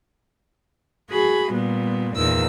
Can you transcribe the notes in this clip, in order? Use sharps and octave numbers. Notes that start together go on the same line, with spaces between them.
F#4 G#4 B5
A#2 G3 B3
E2 A#2 D#3 E6